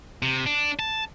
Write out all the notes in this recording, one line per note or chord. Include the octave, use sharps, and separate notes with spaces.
C3
D4
A5